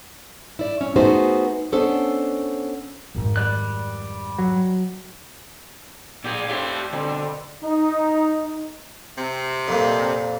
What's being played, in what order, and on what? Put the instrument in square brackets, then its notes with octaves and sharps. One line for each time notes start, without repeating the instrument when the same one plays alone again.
[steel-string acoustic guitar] E4 D5
C#4
A3 B3 D#4 F#4 G#4 C5
B3 C#4 D4 A4 C5
[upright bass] G#1 F2
[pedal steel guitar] G3 D5 F#6
[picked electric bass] F#3
[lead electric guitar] A#2 G#4 [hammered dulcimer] D5 G5
[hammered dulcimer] A2 C4 [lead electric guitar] G4 F5
[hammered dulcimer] B2 G3 C4 [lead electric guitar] D3
[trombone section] D#4
[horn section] C3
[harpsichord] F2 A#2